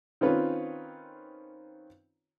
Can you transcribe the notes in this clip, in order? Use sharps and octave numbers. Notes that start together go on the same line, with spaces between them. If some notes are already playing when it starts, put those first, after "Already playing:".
D#3 C4 C#4 F4 B4 C#5